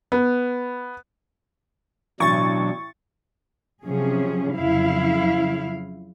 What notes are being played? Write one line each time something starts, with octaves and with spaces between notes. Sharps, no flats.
B3
A1 B2 F#3 D4 C#6 A6
C3 F3 F#3 C#4 G#4
F2 C#3 F#3 E4 F5